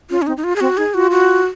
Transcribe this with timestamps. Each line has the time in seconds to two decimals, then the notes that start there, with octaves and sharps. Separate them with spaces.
0.10 C#4 F4
0.22 C#4
0.27 C4 D#4
0.37 D#4
0.44 F4
0.56 G#4
0.60 C4 F#4
0.77 D#4 G#4
0.94 F4 F#4
1.11 F#4